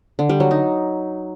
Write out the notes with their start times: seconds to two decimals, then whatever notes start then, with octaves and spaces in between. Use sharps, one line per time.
0.19 D3
0.29 G3
0.40 F#3
0.51 D#4